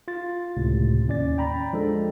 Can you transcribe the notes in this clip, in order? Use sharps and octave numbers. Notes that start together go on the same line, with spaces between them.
F4 A6
C#2 A2 C3
D#2 C#4 D5 A6
G5 A#5 B5
F3 G#3 D4 A4